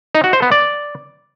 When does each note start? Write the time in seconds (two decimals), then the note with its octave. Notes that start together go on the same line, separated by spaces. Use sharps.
0.15 D#4
0.24 F#4
0.33 C5
0.42 B3
0.51 D5